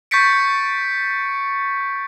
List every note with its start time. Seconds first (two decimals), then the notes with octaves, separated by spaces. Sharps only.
0.11 C#6 G6 A6 B6 C#7 D7